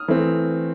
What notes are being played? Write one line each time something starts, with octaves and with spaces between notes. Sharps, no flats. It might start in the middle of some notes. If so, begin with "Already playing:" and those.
Already playing: D#6 F6
E3 A3 C4